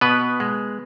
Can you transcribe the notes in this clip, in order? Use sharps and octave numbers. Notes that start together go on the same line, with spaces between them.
B2 B3 B4
G#3